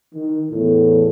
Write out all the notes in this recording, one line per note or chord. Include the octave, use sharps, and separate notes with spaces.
D#3
E2 A2